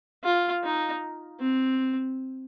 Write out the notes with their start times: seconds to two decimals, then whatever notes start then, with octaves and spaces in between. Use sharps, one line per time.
0.24 F4
0.63 D#4
1.40 C4